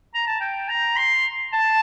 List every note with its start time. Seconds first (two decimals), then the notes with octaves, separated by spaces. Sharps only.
0.14 A#5
0.27 A5
0.40 G5
0.68 A#5
0.96 C6
1.53 A5